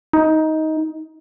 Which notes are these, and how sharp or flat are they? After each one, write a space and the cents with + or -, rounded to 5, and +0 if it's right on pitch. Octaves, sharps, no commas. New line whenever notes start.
D#4 +15